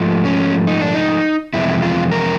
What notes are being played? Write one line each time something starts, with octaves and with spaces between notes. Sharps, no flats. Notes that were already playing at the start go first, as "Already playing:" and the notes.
Already playing: G#2 F3 A3
C#4
D#4
D4
D#4
F2 C3 E3 G#3 E4
F4
A#4